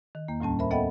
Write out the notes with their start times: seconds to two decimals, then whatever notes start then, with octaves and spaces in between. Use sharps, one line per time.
0.15 D#3
0.28 E2 A#3
0.40 D2 A2 G3 C#4 A5
0.59 A#4 C5 E5 B5
0.71 B3 A4 D#5 E5 F#5 G5